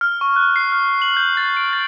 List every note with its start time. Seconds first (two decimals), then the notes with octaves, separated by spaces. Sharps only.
0.01 F6
0.21 C#6
0.36 F#6
0.56 C7
0.72 F6
1.02 F#7
1.17 G6
1.37 A6
1.57 D7
1.73 A6